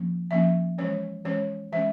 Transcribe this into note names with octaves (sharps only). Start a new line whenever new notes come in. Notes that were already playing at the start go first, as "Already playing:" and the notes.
Already playing: F3 A#3 C#4
F3 A#3 C#4 E5
E3 G#3 C#4 C#5
E3 G#3 C#4 C#5
E3 G#3 C#4 E5